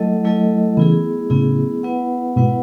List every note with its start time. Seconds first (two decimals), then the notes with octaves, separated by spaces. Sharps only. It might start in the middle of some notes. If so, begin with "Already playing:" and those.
Already playing: F#3 A3 E4 A4 D#5
0.24 F#3 A3 E4 A4 D#5
0.77 C#3 E3 B3 E4 G#4
1.30 A2 C#3 B3 E4 G#4
1.83 B3 E4 B4 F#5
2.36 G#2 B2 B3 E4 B4 F#5